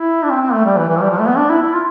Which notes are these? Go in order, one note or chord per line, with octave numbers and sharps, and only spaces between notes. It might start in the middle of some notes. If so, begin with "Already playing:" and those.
Already playing: E4
D4
C4
C4
A3
G3
E3
E3
F3
G3
F3
A3
B3
D4
E4
E4
F4